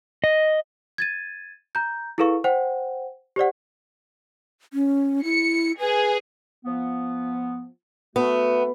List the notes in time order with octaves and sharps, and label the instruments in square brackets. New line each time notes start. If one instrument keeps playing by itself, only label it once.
[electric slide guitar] D#5
[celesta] G#6 A6 D#7
A#5 G6
E4 G#4 A4 B4 F5 C#6
C5 F#5 G5
G4 C5 D5 F#5
[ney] C#4
[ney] E4 [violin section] C#7
[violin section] G#4 [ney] B4
[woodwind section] F3 B3
[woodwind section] A3 F#4 [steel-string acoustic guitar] B3